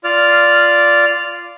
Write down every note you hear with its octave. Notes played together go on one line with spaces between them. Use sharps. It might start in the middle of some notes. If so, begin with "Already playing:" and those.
F4 D5 F6